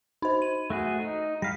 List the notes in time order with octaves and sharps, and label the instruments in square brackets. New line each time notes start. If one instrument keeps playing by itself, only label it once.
[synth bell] D#4 C5
D#7
[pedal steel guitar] A3 F#4 G#4
D#4
[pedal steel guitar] G3 F5 [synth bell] A#6 B6